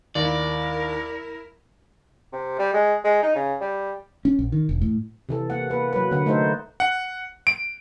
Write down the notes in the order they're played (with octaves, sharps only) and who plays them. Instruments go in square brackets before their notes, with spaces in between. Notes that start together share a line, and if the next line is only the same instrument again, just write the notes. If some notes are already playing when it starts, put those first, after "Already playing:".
[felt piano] D#2 [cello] E4 A#4 [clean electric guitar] D5
[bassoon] C3
G3
G#3
G#3
D#4
C#3
G3
[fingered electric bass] C#4
A#1
D#3
E1
A2
[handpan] C3 E3 A4
A#3 F#5
A#3 B4
F#3 B4
D3 A#3 B4 F#5
A3 D#4 A4 C5
[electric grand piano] F#5
D7